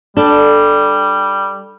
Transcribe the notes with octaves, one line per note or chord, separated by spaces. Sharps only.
G3 D4 A4